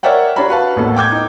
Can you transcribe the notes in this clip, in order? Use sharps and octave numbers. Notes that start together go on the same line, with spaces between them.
A#4 C#5 D5 E5 F#5 G5
D4 G4 C#5 A#5 B5
F#4 B4 F5 A5
A1 D#2 B3 A4
G5 D6 G6 G#6
D#4